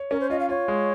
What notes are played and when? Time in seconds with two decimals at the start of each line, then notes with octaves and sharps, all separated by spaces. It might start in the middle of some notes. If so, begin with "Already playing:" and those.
Already playing: C#5
0.11 C#4 A#4
0.20 C5
0.30 F4 D#5
0.39 F5
0.49 F4 C#5
0.68 G#3